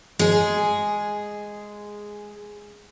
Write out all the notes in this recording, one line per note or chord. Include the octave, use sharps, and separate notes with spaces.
G#3 G#4